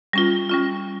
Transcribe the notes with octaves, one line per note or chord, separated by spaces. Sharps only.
G3 C#4 F4
G3 C#4 F4